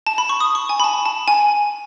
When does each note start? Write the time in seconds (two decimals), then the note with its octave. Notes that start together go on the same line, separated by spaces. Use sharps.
0.07 A5
0.18 B5
0.29 C#6
0.40 D#6
0.55 C#6
0.69 G#5
0.80 B5
0.84 A5
1.05 A5
1.28 G#5